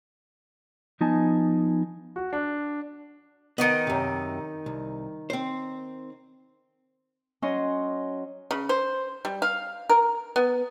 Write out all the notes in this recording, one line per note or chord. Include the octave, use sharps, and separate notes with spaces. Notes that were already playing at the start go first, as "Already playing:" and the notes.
F3 B3 D#4 G#5 A5
F#4
D4
D#3 B3 D#4 D#5
F#2 C3
C2
C4 C5
F#3 C#4 D#5 C6
C#3
C5
G3
F5
A#4
B3